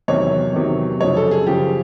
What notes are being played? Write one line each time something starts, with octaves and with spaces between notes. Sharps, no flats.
E2 C3 D#3 F#3 C#5
E2 C3 D#3 F#3
F#2 C#3 F3 C#5
A4
G#4
F#2 C#3 F3 G4